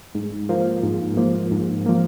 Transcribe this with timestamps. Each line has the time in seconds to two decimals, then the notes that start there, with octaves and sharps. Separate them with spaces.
0.15 G#2
0.49 F3 A#3
0.83 G#2
1.17 F3 A#3
1.51 G#2
1.86 F3 A#3